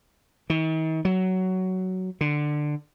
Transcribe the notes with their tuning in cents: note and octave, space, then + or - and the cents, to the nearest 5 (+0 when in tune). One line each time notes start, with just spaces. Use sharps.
D#3 +45
F#3 +10
D3 +15